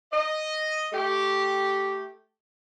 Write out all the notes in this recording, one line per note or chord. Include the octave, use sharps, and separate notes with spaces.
D#5
A3 G4